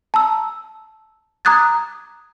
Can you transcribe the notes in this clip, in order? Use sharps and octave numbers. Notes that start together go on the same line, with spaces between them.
A5 A#5 E6
A#5 D6 D#6 F#6 G#6 A6